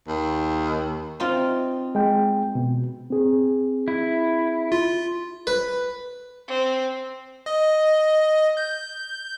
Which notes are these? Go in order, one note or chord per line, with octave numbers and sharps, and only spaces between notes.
D#2
C4 D#4 F4
G#3 G5
B2
C4 G#4
E4
F4
B4
C4
D#5
G6